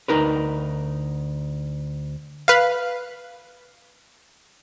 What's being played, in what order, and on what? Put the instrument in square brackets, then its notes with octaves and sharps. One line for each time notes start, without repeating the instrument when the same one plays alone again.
[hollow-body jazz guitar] D2 D#4 A#4 B4
[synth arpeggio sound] B4 F5